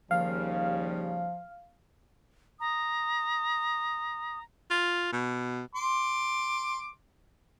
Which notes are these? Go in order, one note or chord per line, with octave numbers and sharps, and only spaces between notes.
D#2 C#3 F3 G3 F5
A#5 D#6
F4
B2
C6 D6